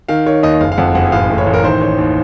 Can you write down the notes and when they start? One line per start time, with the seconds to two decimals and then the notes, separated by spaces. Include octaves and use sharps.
0.09 D#3 F5
0.26 D#3 C#5
0.43 D#2 D#5
0.60 F#1 F5
0.72 F5
0.78 F2 F#5
0.95 F#1 F#5
1.12 A1 F5
1.30 A2
1.38 C#5
1.47 A1
1.54 A#4
1.64 D#3 C5
1.81 D#3 C#5
1.98 D#2